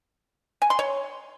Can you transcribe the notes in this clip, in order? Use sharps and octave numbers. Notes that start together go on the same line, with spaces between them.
G#5
C6
C#5